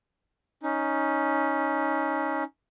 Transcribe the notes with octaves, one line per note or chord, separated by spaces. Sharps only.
C#4 D#4